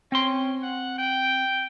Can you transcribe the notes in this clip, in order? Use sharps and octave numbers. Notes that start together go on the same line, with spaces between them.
C4 C#4 C6
F#5
G5